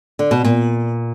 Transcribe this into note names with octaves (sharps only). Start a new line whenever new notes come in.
D3
B2
A#2